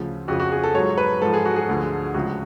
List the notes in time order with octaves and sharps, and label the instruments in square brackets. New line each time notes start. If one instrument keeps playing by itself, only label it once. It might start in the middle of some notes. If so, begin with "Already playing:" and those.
Already playing: [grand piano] D2 C#3 F3
F2 C#3 F3 F#4
F#4
G#4
A4
G#2 F#3 C#5
B4
G#2 F3 A4
G#4
F#4
G#4
D2 D3 F3
C#2 C#3 F3 F#4